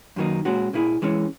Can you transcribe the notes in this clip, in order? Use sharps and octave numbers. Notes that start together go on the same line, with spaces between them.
F#2 D#3 F#3 A#3 D#4
A#2 G#3 C#4 F#4
A#2 A#3 E4 G#4
E3 G#3 C#4